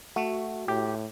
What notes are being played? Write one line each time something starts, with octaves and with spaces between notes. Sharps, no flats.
A3 F#4
A2 G4